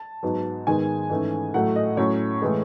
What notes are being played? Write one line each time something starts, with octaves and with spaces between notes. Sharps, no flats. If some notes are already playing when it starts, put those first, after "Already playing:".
Already playing: A5
G#2 F#3 B3
G#2 D#3 G#3 B3 G#5
G#2 E3 A3 C#4
A2 F#3 A3 F#5
D#5
A2 F#3 C#4 C#5
A2 E3 G#3